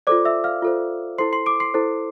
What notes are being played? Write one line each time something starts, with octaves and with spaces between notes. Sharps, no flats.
F4 A4 C5 D5 D6
E5 E6
F5 F6
F4 A4 C5
E4 A4 C5 C6 C7
C6 C7
D6 D7
C6 C7
E4 A4 C5